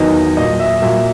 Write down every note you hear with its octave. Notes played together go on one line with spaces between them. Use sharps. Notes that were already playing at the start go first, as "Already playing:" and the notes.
Already playing: E2 D#3 F#3 D#5
A#2 F#3 D#5
E5
A#2 F#3 E5